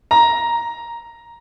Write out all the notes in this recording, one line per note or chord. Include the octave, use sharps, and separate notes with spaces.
A#5